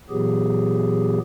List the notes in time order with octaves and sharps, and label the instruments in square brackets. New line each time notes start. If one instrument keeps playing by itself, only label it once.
[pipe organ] A#2 E3 F#3 B3 G4 G#4